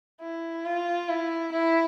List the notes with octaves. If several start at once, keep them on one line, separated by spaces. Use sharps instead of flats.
E4
F4
E4
E4